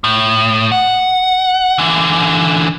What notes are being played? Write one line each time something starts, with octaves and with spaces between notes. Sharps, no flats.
A2
F#5
D3 E3